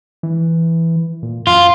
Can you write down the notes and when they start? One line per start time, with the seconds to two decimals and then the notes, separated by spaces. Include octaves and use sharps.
0.23 E3
1.23 A#2
1.47 F#2 F4